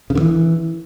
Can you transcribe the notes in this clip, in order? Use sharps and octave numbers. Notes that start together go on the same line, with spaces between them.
C#3
D3
E3